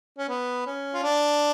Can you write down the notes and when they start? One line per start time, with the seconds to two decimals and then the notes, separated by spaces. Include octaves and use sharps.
0.18 C#4
0.29 B3
0.66 C#4
0.94 F4
1.03 D4